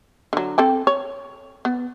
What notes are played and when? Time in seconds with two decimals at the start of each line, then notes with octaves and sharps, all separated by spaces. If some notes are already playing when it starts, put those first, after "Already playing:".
0.33 D3 F#3
0.58 C4 A4 G5
0.87 C#5
1.65 B3